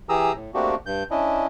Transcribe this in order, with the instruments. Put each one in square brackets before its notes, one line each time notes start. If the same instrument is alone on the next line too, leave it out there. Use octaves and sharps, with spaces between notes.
[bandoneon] E3 G4 G#4 A#5 D#6 E6
A2
A3 A#3 C4 D4 F#4 G4
G2 G6
C#4 D4 E4 D#5